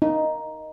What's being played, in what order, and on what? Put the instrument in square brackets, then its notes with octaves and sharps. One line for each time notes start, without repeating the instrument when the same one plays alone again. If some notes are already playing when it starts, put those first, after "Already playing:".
[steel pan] D#4